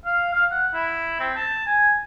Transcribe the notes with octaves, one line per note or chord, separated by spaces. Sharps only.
F5
F5
F#5
E4
C4
A5
G#5